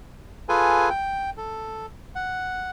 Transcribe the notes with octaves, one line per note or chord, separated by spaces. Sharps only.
F4 G#4 A4 B4 G#5
G5
A4
F#5